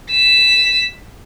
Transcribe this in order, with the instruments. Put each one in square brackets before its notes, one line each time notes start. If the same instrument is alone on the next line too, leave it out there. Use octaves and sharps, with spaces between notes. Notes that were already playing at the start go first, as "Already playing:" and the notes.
[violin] B6 E7